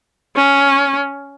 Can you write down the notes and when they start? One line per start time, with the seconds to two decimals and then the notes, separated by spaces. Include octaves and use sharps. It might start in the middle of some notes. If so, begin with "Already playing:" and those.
0.36 C#4